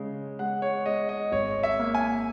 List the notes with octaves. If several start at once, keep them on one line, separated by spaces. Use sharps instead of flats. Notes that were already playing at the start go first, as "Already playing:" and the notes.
Already playing: C#3 G#3
G#3 F#5
C#5
G#3 D#5
D#5
G#1 C#5
E5
A#3
G#5